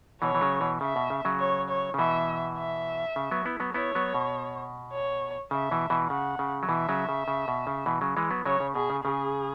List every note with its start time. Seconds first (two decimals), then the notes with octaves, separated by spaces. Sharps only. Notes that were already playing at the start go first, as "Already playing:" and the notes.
0.22 B2 E3 C#5
0.35 E3
0.41 C#3 F#3
0.61 B2 E3
0.81 C#3 E5
0.96 B2
1.10 C#3
1.25 C#3 F#3
1.40 C#5
1.69 C#5
1.94 C#3
1.99 B2 E3 E5
2.58 E5
3.16 C#3
3.31 F#3 B3
3.45 B3 E4
3.60 F#3 B3
3.74 B3 E4 C#5
3.95 F#3 B3
4.14 B2
4.92 C#5
5.51 C#3 E5
5.71 B2 E3
5.90 B2 E3
6.10 C#3 F#5
6.39 C#3
6.63 F#3
6.69 B2 E3 E5
6.89 C#3 F#3
7.09 C#3
7.28 C#3
7.48 B2
7.67 C#3
7.86 B2 E3
8.01 C#3 F#3
8.17 E3 G#3
8.31 F#3 B3
8.45 C#3 F#3 C#5
8.60 C#3
8.75 B2 G#4
8.90 C#3
9.05 C#3 G#4